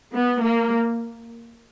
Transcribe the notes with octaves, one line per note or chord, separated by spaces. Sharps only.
B3
A#3